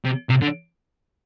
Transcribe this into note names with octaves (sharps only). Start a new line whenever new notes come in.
C3
C3
D3